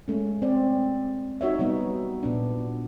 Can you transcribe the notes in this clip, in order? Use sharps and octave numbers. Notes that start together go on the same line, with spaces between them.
G#3 A3 C#4
C4 D5
D#4 F#4 C#5 E5
F#3 G3 B3 D#4
A#2 B3 D4